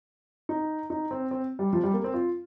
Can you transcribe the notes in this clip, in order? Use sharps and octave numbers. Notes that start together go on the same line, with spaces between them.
D#4
D#4
C4
C4
G3
F3
G3
A#3
C4
F4